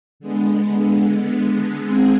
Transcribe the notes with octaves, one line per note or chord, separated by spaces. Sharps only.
D3 G#3 B3
G#3 C4 G#4